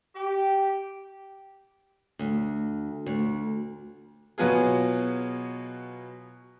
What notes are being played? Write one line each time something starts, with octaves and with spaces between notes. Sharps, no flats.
G4
D2
D2
B2 F#3 B3 F4 G#4